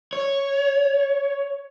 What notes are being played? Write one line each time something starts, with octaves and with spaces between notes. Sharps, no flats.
C#5